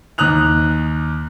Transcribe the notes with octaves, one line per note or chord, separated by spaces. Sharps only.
D#2 A#5 D#6 F#6 F7